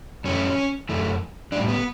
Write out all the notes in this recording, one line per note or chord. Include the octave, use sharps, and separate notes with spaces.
F#2 E3 A3 C#4
F#2 E3 A3
A2 G3 D4
B3